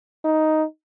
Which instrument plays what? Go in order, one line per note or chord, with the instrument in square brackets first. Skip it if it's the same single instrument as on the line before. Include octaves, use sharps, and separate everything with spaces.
[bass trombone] D#4